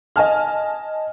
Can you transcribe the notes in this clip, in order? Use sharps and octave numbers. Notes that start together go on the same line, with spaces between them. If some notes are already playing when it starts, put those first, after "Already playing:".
D#5 G#5 A5 F6